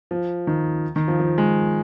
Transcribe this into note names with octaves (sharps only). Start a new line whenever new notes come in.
F3
D#3
D#3
F3
F3
G#3